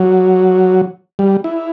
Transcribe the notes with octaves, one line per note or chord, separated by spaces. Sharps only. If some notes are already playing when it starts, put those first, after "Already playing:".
Already playing: F#3
G3
E4